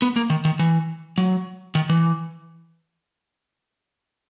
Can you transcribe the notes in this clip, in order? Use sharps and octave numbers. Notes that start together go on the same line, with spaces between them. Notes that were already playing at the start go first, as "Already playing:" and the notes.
B3
A#3
D#3
D#3
E3
F#3
D#3
E3